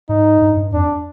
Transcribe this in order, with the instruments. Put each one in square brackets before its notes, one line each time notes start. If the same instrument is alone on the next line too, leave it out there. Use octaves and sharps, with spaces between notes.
[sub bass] G#2 [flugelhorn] D#4
[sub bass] G2
G2
[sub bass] F2 [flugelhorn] D4